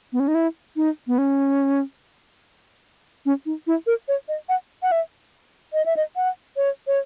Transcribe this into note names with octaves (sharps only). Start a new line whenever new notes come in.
B3
C#4
D#4
E4
D#4
B3
C#4
C#4
D#4
E4
A#4
C#5
D#5
F#5
F#5
E5
D#5
E5
D#5
F#5
C#5
C#5